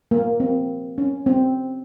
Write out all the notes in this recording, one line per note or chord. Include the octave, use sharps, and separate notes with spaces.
A#3
C4
C#4
C4